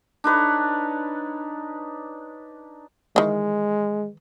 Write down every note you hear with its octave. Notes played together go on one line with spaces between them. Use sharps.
D4 D#4 B4 C#5
D#3 E3 G#3